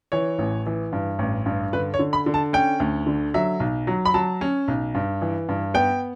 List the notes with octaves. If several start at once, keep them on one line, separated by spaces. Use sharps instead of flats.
E3 C#5
A1
E3
G2
A1
G2
D3 B4
C#5
D3
B5
D3
A5
C#4 G5
D2
D3
F#3 E5
B1
F#3
B5
F#3 A5
C#4
B1
G2
E3
G2
B3 G5